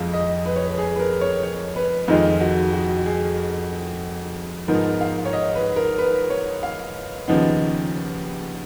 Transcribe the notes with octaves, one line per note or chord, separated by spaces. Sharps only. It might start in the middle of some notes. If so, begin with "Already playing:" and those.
Already playing: F2 F3 G#3 F5
D#5
B4
C#5
B4
G#4
B4
A#4
C#5
C#5
B4
F2 D#3 G#3 D#4 F4
F#4
F#4
G#4
G#2 F3 B3 D#4 A#4
F5
C#5
D#5
B4
A#4
B4
C#5
F5
D#2 C#3 F3 B3 D#4